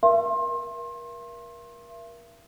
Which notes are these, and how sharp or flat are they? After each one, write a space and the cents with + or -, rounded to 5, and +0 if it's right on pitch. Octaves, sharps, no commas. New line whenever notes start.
A#4 +30 E5 +40 C6 +30